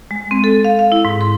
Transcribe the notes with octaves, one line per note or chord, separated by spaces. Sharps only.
G#3
C4
A4
F5
F5
E4
G#2
C6